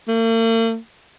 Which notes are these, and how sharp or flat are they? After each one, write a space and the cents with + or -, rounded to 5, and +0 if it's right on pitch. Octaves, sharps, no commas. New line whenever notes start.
A#3 -45